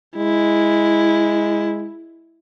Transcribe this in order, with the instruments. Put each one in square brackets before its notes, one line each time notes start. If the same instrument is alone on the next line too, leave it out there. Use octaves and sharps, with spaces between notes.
[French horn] G#3 [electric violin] E4